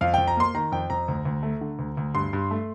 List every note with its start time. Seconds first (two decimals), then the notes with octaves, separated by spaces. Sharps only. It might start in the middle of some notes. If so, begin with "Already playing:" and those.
0.01 F2 F5
0.14 F2 G5
0.27 A#5
0.37 A#3 C6
0.54 D#3 A#5
0.72 F2 G5
0.90 F2 A#5
1.08 D2
1.25 D2
1.43 A3
1.61 D3
1.79 D2
1.97 D2
2.15 G2 C6
2.33 G2
2.51 A3